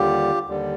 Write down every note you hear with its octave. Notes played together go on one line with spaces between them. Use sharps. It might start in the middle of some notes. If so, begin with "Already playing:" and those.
Already playing: D#2 D3 G3 F4 G4
D#2 D3 G3